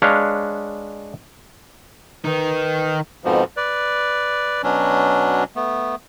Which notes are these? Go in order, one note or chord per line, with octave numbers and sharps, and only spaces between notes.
G#3 D4 B4 C#5 F5
D#3 D#4 B4
F2 G#2 B2 F3
B4 D5
B2 F#3 C#4 D4
A3 B3